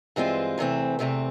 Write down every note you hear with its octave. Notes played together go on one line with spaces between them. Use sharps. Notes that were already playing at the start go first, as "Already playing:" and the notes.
G2 E3 G#3 C4 F4
E2 C3 E3 A3 C4
E2 C3 E3 A3 C4